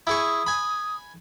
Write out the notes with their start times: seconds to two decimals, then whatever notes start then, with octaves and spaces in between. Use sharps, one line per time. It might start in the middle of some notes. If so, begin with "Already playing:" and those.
0.07 E4 G#4 C#6 D#6
0.46 G#5 B5